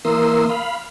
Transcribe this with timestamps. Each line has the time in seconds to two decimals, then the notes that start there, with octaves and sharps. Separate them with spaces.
0.05 E3 A#3 A#4 C6 D#6 E6
0.50 F5 B5